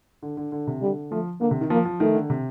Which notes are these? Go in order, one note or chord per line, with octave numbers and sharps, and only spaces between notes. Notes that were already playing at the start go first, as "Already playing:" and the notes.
D3
D3
D3
C3
D3 G3
F3 A3
D3 A#3
C3
D#3
F3 A#3
F3
D#3 A3
D3
C3